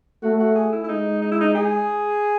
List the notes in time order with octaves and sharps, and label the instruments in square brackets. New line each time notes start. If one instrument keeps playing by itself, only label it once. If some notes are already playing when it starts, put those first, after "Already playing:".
[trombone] A3 [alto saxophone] F#4
[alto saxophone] F#4
G#4
E4
E4
[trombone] G#3 [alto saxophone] D#4
[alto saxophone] D#4
E4
D#4
G#4